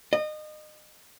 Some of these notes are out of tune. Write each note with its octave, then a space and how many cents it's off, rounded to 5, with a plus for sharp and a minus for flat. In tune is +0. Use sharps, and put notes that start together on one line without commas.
D#5 -30